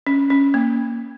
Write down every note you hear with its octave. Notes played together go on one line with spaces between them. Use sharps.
C#4
C#4
A#3